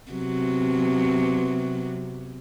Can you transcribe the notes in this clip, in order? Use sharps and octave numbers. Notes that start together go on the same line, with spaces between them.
C3 F#3 B3